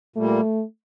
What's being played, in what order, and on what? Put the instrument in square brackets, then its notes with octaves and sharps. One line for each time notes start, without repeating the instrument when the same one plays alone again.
[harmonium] A#2 G3 A#3 [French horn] A3